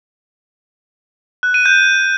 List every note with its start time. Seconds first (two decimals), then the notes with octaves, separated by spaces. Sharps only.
1.43 F#6
1.54 D#7
1.66 G6